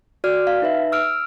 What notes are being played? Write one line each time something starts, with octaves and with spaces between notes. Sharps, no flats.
F#4 D5 F6
F5
D#4 B4 E5
E6 F6 D7